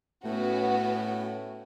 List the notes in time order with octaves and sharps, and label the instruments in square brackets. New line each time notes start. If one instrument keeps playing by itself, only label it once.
[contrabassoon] A2 [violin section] B3 C#4 F#4